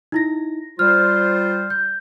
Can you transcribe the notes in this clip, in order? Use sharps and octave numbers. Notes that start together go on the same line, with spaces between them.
D#4 E4 A#6
G3 F4 C5 F6
G6